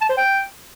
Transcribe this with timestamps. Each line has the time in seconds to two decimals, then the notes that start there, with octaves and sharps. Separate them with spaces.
0.02 A5
0.09 C5
0.17 G5